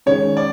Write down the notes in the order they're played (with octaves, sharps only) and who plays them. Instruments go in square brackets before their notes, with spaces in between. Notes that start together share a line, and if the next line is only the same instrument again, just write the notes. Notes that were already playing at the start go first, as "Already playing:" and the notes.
[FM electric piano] D#3 G#3 C#4 [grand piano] C#5
[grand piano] D5